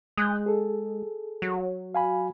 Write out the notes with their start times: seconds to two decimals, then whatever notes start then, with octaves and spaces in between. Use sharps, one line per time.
0.17 G#3 D#6 F#6 G6
0.46 G#4 A4
1.42 F#3
1.95 F5 G#5 B5